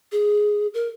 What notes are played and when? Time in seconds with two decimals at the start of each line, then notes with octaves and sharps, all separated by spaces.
0.12 G#4
0.74 A#4